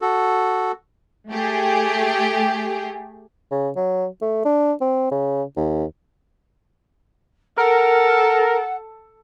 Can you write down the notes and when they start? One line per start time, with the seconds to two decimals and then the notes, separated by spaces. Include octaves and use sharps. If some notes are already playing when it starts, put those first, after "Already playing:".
0.02 F#4 A4
1.30 A3 G4 G#4
3.51 C#3
3.76 F#3
4.22 A3
4.45 D4
4.81 C4
5.12 C#3
5.57 D#2
7.58 A4 A#4 F#5